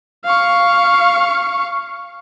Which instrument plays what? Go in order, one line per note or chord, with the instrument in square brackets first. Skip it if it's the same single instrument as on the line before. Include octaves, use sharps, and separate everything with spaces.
[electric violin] F5 C#6